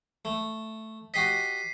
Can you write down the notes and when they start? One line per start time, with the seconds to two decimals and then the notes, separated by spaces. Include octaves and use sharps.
0.25 A3
1.14 F#4 G4 D#5 B6 C7 D#7